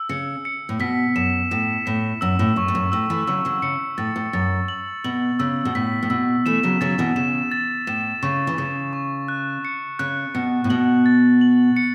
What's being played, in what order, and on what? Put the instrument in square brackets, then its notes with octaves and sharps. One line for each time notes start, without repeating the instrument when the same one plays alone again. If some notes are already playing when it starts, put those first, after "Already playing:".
Already playing: [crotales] E6
[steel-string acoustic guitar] C#3 [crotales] C#7
[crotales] C#7
[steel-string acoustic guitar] A2
[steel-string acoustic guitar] B2 [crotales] B6
[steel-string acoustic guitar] F#2 [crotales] E7
[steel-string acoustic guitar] A2 [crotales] E7
[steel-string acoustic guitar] A2 [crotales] B6
[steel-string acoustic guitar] F#2 [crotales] E6
[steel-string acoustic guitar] A2
[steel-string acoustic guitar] F#2 [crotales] C#6
[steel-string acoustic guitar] A2
F#2
[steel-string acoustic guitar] A2 [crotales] E6
[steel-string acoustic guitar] E3 A3
[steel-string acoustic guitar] C#3 F#3 [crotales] E6
[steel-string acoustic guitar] C#3 F#3
[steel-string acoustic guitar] C#3 [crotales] C#7
[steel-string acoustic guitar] A2 [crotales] A6
[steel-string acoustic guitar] A2
[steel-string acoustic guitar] F#2 [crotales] A6
[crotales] F#7
[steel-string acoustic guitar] B2 [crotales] F#7
[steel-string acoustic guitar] C#3 [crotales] E6
[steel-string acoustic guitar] B2
[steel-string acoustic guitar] A2 [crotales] B6
[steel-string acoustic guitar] A2
[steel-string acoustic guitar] B2 [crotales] E6
[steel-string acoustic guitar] E3 A3 [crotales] E7
[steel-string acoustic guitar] C#3 F#3
[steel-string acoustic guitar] C#3 F#3 [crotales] A6
[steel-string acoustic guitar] B2 E3
[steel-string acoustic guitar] C#3 [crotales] E7
[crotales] A6
[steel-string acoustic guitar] A2 [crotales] E7
[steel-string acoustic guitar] C#3 [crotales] C#6
[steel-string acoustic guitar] E3
[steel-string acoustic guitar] C#3 [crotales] E7
[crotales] C#6
F#6
C#7
[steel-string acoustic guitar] C#3 [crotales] F#6
[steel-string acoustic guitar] B2 [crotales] C#7
[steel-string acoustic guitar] A2
[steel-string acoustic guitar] B2 [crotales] F#7
[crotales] A6
F#7
C#7